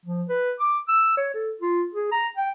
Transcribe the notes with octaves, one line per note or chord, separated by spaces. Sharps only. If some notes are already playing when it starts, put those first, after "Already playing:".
F3
B4
D6
E6
C#5
A4
F4
G#4
A#5
G5